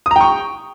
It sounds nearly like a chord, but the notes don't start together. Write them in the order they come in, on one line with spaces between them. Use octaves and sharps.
D#6 A#5 G5 C#6